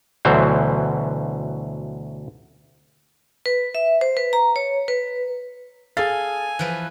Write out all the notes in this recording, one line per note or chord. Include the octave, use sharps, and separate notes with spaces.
D2 B2 E3 F#3 C5
B4
E5
C5
B4
A#5
C#5
B4
G#4 A4 F5 G#5 A6
E3 F3 B4